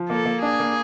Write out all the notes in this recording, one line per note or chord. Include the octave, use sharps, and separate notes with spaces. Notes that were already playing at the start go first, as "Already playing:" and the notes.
Already playing: F3
A#3 A4
A#3
D4 G#4
A#3